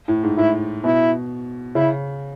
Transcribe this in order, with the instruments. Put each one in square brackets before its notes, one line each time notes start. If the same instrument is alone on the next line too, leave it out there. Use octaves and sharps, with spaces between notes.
[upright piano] A2
G#2
[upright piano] A2 [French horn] E4
[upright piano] B2 [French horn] E4
[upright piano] C#3 [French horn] E4